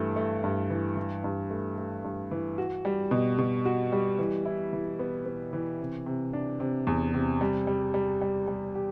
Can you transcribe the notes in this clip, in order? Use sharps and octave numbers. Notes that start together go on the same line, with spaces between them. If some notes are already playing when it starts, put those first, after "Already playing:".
Already playing: G2 E3 A3
A3
G2
E3
E3
G2
A3
A3
G2
E3
F#4
G3
B2
B2
F#4
G3
E3
E4
E3
B3
B3
E3
C3
C3
D4
C3
E2
C3
G3
G3
G3
G3
G3
G4